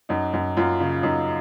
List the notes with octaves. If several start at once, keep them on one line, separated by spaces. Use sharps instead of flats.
F#2 D#4
F#2
F#2 F4
C#3
F#2 D#4